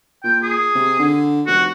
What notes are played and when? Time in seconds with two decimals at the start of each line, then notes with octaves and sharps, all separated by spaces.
0.24 A#2 G5
0.42 G#4
0.75 C3
1.00 D3
1.47 F1 F#4